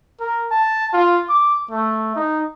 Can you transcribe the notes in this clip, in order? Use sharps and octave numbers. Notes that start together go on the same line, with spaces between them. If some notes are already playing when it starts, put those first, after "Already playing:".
A#4
A5
F4
D6
A3
D#4